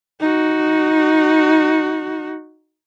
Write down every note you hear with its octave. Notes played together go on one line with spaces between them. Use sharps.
D#4 F#4